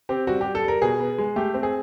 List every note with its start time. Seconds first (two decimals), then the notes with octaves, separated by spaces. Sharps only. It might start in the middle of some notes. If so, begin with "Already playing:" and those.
0.09 C4 G4
0.27 G3 F#4
0.41 G4
0.46 G3
0.55 A4
0.63 G3 A#4
0.82 B2 G#4
1.00 B3
1.18 G#3
1.36 A3 G4
1.54 C4
1.63 G#4